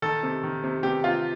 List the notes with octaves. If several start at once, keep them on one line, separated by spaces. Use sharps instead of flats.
D#3 A4
C3
D#3
C3
C3 G4
C3 F4